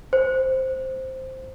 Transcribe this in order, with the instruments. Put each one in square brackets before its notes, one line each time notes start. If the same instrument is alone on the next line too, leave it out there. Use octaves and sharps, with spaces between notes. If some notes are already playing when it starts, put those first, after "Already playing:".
[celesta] C5